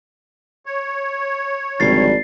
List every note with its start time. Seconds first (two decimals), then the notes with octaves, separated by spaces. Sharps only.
0.66 C#5
1.80 G#1 F2 D3 G3 A6 C7